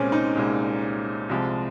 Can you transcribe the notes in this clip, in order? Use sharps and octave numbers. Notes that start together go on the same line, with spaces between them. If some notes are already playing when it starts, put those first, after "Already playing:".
Already playing: C2 A#2 G#3 C4 C#4
D#4
C2 A#2 G#3
C2 C3 F3 G#3